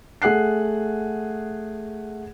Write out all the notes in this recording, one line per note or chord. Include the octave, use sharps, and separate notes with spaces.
A3 G#4 F#5 F#6 C7